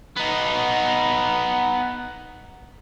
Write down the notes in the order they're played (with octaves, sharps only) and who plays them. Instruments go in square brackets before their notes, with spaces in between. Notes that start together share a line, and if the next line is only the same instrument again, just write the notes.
[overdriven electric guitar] B3 D#4